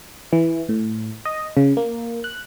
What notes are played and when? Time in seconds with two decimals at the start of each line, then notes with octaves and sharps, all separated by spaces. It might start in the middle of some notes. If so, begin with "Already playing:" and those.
0.33 E3
0.69 A2
1.25 D#5
1.57 C#3
1.77 A#3
2.24 F#6